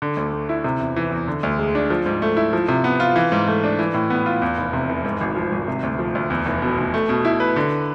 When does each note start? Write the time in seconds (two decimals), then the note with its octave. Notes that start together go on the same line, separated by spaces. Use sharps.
0.02 D3
0.17 D2
0.33 A3
0.49 E4
0.64 C3
0.80 E2
0.96 E3
1.11 E2
1.27 D3
1.43 D2
1.59 G#3
1.75 D4
1.90 F3
2.06 G#2
2.22 A3
2.37 E4
2.53 F3
2.69 C3
2.84 B3
3.00 F4
3.16 E3
3.32 G#2
3.47 A3
3.64 D4
3.79 E3
3.94 A2
4.10 B3
4.26 F4
4.42 E2
4.58 F1
4.73 C3
4.89 F1
5.05 G#2
5.21 G#1
5.36 F3
5.52 G#1
5.68 C3
5.83 D2
5.99 F3
6.15 D2
6.30 E2
6.46 F1
6.62 B2
6.78 F1
6.94 A3
7.09 B2
7.25 E4
7.40 B4
7.56 D3